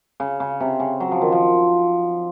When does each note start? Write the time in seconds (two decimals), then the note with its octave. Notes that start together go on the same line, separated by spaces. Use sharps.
0.20 C#3
0.40 C#3
0.60 C3
0.80 C#3
1.00 F#3
1.11 F3
1.22 D#3
1.32 F3